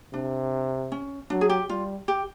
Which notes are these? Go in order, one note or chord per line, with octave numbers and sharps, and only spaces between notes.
C3 D4
C#4
F#3 D4
G#4
G4
G3 F4
G4